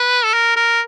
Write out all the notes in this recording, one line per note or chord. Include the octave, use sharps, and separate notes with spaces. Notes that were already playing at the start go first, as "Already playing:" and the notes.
Already playing: B4
A4
A#4
A#4